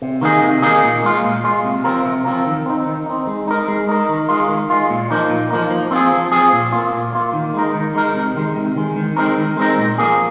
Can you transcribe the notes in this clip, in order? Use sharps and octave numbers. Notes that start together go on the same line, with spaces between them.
C3
D#3 A#3 D#4 G#4
C3
D#3 A#3 D#4 G#4
A#2
G#3 F4
A#2
G#3 F4
C3
F3 C4 F4 A#4
C3
F3 C4 F4 A#4
D#3
C4 D#4
D#3
C4 D#4
G#3
D#4 A#4
G#3
D#4 A#4
D#3
G#3 F4
D#3
G#3 F4
A#2
F3 A#3 D#4
A#2
F3 A#3 D#4
F3
C4 F4 G#4
F3
C4 F4 G#4
A#2
A#3 F4
A#2
A#3 F4
D#3
G#3 D#4 A#4
D#3
G#3 D#4 A#4
C3
D#3 G#3
C3
D#3 G#3
D#3
G#3 C4 D#4 A#4
D#3
G#3 C4 D#4 A#4
A#2
F3 A#3 G#4